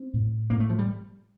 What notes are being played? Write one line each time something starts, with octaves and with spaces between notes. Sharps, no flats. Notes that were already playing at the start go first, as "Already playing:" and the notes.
Already playing: C4
A2
A2 A#3
A3
F3
G3